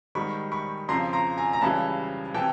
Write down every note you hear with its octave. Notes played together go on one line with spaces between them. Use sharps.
G#2 D#3 G3 B5 C#6
B5 C#6
F2 C#3 F3 A#5 C6
A#5 C6
G#5 A#5
A#5
C#2 C#3 E3 G3 A5 B5
C3 E3 G5 A5